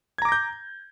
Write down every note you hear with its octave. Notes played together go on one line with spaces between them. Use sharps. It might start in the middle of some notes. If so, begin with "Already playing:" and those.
A#5 D6 G6 G#6 A#6